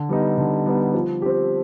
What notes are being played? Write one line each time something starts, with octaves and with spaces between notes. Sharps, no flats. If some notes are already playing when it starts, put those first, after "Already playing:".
Already playing: D3
G3 B3 D#4
D3
G3 B3 D#4
F3
C4 G4